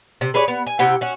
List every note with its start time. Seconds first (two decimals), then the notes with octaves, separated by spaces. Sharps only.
0.21 C3
0.34 G#4 B4 C#5 D5
0.48 B3
0.67 G#5
0.79 C3 E4 G4 F#5
1.01 C#4 F#4